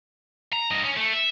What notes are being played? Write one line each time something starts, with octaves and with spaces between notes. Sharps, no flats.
A#5
G2 D#5
C#4
A3
E5